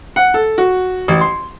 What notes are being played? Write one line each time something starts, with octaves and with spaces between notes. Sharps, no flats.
F#5
A4
F#4
A1
C6